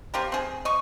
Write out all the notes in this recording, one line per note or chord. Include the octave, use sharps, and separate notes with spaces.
C4 F4 G4 A#4
C4 G#4
D#5 C#6